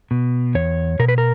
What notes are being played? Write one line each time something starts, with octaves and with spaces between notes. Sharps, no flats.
B2
E2 C#5
B2 A#4
B4
A#4